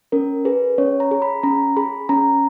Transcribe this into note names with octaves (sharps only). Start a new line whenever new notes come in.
C#4 A#4
G#4 B4
C#4 C#5
A#5
G#4
B5
C#4 A#5
G#4 B5
C#4 A#5